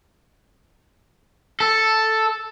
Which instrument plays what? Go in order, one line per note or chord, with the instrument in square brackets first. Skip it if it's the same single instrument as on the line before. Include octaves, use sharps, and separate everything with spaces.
[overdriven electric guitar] A4